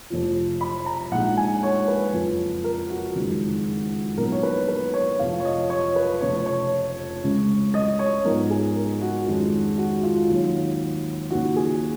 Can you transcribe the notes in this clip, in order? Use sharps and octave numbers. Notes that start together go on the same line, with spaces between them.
F1 F2 F3
B5
A#5
A#1 A#2 G#3 D#4 F#5
G#5
C#5
B4
F#1 F2 F3
A#4
F#4
F#1 F2 D#3 G#3
A#1 A#2 F#3 B3 D#4 A#4
C#5
B4
B4
C#5
F1 F2 F3 F5
C#5
D#5
C#5
B4
F1 F2 C#3 C#5
C#5
C#2 C#3 G#3
D#5
C#5
G#2 F3 B3 D#4 A#4
G#4
A#4
F#4
F2 D#3 G#3 C#4
F#4
F4
D#2 D#3 F#3
D#2 C#3 F3 A#3 D#4 F#4
G#4